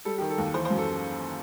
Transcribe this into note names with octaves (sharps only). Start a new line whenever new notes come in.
G3 A4
D#3 G4
A4
D#2
E3 C5
C5
F#2
A4